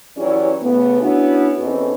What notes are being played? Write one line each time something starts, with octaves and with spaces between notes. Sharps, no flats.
E3 F#3 C#4 E4 G4 D5
C#3 E3 A3 B3
B3 C#4 D4 E4 F#4
E2 C4 C#4 D#4 A4 B4